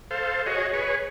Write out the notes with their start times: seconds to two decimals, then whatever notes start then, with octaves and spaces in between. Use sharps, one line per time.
0.11 A4 C5 F5
0.46 F#4 G#4 C#5 D#5
0.73 G#4 B4 C#5